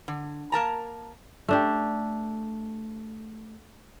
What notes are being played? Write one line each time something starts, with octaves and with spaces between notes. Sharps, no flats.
D3
A#3 A#4 A5 A#5
A3 D4 G4